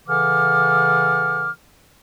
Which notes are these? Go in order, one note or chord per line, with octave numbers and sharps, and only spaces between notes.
C#3 E3 A4 F#5 D6 F6